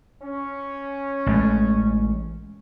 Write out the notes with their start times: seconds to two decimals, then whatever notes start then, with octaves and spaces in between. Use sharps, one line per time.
0.23 C#4
1.26 A1 G#3 A3